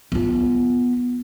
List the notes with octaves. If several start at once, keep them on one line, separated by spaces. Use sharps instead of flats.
B3 F4